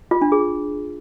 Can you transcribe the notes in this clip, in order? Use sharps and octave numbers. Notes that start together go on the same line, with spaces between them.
F4
D4
G#4